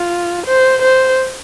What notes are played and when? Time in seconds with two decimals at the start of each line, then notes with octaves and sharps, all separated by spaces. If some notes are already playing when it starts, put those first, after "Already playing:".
Already playing: F4
0.46 C5
0.82 C5